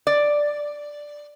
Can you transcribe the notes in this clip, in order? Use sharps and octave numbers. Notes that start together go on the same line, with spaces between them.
D5